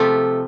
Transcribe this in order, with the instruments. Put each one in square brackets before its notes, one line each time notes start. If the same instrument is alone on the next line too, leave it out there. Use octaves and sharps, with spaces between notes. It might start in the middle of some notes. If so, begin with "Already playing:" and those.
Already playing: [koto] C3 F3 A3